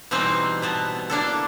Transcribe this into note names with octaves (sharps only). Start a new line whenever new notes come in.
B2 E3 G3 C4 D#4 C5
B2 B3 A5
A#3 D4 E4 A4